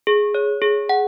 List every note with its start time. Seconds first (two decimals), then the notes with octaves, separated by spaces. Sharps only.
0.07 G#4
0.34 C#5
0.62 G#4
0.89 F#5